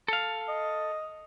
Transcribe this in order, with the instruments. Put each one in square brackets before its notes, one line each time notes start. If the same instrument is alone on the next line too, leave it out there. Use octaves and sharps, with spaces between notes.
[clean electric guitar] A4 F5
[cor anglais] D#5